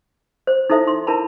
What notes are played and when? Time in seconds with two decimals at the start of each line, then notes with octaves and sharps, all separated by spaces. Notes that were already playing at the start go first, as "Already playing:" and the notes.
0.47 C5
0.70 D#4 E4 A4 C5 E5
0.87 C6
1.07 D4 E4 A#4 A5 B5